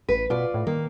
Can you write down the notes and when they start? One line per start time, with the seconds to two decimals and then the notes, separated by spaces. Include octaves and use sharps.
0.09 A1 B4
0.30 B2 F4 D5
0.54 A2
0.67 D#3 A#3